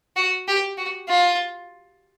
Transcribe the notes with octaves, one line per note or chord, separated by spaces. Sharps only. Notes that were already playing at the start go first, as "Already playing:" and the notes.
F#4
G4
F#4
F4